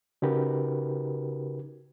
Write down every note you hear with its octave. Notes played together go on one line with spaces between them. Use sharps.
C#3 D#4 F#4 G4 A#4 B4